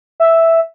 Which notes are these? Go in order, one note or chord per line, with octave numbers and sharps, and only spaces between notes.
E5